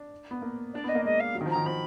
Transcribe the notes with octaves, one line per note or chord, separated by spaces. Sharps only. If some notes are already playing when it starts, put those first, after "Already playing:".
Already playing: D4
B3
A#3
D4 D5
B3 D#5
A#3
G#3 D#5
F5
F#3
D#3
F3
D#3 A#5
F3 B5